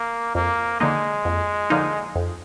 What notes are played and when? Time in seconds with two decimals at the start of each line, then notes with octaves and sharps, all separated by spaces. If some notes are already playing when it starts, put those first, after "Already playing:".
Already playing: A#3
0.35 F2 A#3
0.80 D3 F3 G#3 A#3 D#4
1.25 F2
1.70 D3 F3 A#3 D#4
2.15 F2